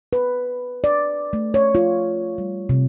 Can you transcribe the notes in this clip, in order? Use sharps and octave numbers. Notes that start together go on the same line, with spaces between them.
B4
D5
A3
C#5
F4
G3
C3